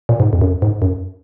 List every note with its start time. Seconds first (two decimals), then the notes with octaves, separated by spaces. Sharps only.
0.09 A#2
0.20 G#2
0.33 F2
0.41 F#2
0.62 G#2
0.82 F#2